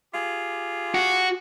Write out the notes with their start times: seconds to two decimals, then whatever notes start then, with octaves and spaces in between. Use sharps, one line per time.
0.14 F4 G4 G#4
0.95 F#4